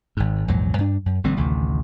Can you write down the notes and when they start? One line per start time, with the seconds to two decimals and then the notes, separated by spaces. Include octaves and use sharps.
0.17 G#1 G#2
0.48 A#1 E2 G#2 F#3
0.78 G2 D4
1.06 F#2
1.24 A1 D3 G3 C4
1.37 A1 D2 C3 D#3